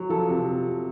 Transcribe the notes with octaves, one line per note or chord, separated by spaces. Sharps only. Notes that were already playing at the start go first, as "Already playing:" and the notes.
Already playing: F#3
F3 A4
C3